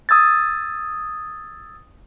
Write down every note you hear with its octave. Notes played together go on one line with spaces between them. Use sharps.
D#6 E6 G#6 A6